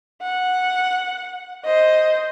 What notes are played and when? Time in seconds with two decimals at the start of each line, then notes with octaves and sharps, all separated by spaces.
0.22 F#5
1.65 C5 D#5